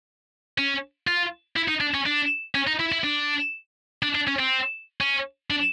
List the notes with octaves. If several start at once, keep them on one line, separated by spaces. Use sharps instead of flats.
C#4
F4
E4
D#4
D4
C#4
D4
C#4
D#4
E4
E4
D4
D4
D4
C#4
C4
C#4
D4